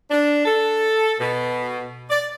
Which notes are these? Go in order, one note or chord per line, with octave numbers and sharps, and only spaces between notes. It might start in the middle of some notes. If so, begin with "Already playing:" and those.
D4
A4
B2
D5